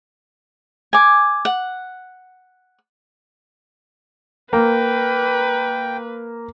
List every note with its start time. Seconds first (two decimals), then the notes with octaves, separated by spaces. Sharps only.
0.93 G#5 D6
1.45 F#5
4.53 A#3 B4 G5